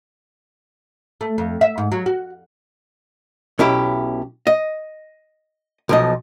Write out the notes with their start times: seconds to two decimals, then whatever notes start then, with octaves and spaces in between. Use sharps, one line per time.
1.21 A3
1.38 F2
1.61 E5
1.78 G#2
1.92 F#3
2.06 F#4
3.59 B1 C#4 E4 G4
4.47 D#5
5.89 B1 F3 D#5